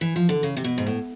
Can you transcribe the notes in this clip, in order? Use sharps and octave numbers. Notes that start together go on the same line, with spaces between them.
E3
F3
D3
C#3
C3
B2
G#2
A2